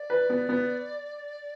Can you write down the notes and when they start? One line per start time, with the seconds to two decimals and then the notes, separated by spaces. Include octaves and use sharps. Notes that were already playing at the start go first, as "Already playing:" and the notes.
Already playing: D5
0.10 B4
0.30 B3
0.49 B3